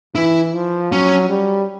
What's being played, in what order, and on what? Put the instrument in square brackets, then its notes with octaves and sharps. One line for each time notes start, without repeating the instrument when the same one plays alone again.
[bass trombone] E3 [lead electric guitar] E4
[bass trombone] F3
[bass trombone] F#3 [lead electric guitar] C#4
[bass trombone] G3